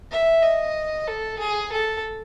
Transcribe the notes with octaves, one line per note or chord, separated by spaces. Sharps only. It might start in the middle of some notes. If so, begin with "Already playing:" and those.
E5
D#5
A4
G#4
A4